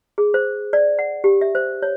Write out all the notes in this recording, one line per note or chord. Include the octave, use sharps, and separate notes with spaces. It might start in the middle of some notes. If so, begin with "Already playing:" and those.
G#4
C5
D5
F#5
G4
E5
C5
C#5